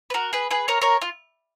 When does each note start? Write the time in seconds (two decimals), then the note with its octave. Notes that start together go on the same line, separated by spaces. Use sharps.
0.10 B4
0.14 F#4 A#4
0.33 G#4 B4
0.51 G#4 B4
0.68 A#4 C#5
0.82 A#4 C#5
1.02 F4